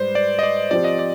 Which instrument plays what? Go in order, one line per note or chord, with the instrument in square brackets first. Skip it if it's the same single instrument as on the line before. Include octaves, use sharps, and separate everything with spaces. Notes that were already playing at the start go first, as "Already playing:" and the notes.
Already playing: [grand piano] G#2 G3 [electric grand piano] B4 C5 D5
[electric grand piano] D5
D#5
D5
[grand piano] F3 C4 G4 C5 [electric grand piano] D5
[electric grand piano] D#5
D5